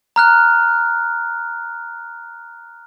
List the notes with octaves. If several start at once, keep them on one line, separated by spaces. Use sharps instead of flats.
A#5 F6 F#6